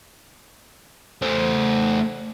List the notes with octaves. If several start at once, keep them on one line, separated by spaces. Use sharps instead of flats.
A3 C5